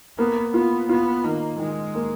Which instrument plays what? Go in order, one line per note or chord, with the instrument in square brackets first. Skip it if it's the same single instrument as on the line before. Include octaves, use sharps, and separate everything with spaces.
[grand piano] A#3 [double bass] B3
[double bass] B3 [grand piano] F4
[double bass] B3 [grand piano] F4
[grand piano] D#3 [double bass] A#3
[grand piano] D#3 [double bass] G#3
[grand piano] A#3